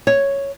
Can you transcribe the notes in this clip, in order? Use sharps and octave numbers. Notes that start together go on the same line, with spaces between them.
C#5